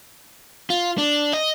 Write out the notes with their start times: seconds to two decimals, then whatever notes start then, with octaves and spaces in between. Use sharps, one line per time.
0.70 F4
0.98 D4
1.33 D#5